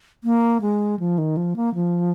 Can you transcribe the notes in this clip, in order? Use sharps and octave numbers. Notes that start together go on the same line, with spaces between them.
A#3
G#3
F3
D#3
F3
A#3
F3